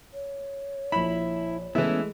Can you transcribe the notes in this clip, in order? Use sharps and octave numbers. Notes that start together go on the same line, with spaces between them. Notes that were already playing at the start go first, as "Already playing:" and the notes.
C#5
A#1 E4 B5 E7
E3 G#3 A3 B3 C#4 E4